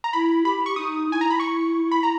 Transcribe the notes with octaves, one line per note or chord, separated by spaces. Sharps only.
A#5
E4 B5
G4 B5
C#6
D#4 D#6
E4 G#5
A#5
B5
C#6
B5
A#5